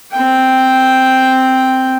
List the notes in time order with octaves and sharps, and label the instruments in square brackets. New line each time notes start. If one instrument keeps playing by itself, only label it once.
[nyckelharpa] C4 G5